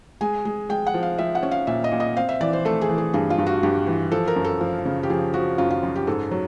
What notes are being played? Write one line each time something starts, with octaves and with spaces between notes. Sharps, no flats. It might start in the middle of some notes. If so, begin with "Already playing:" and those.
G#3 G#5
G#3
G#3 G5
F#5
F3
F5
F3 E5
F#5
C#4
F5
A#2 E5
D#5
A#2
D#5
C4 F5
E5
E3 D5
C5
A3 A4
G#4
E3
G#4
G2 G#4
F4
G2
F#4
G2 G4
E3
F3 A4
A#4
F#2
A4
F3
C#3
G4
F3 G#4
F3 F#4
F#2 F4
F4
F#2
G4
G#2 A4
F#3